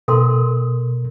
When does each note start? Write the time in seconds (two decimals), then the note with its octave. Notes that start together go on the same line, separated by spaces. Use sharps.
0.08 B2 A4 A#4 C6